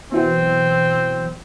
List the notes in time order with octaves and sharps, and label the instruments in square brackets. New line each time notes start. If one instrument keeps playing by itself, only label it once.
[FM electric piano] B2 E3 F#3 [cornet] C4